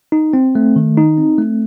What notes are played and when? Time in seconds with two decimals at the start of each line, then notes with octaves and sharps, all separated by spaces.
0.12 D#4
0.33 C4
0.55 A3
0.76 D#3
0.97 D#4
1.17 C4
1.38 A3